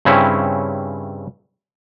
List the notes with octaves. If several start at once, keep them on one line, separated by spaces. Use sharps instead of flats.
G2 C#3 C4 C#4 E4